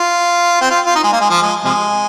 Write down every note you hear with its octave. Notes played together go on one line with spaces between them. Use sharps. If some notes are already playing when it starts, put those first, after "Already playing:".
Already playing: F4
C4
F4
F4
D#4
G#3
A#3
G#3
F3
G#3
C3 F3 G#3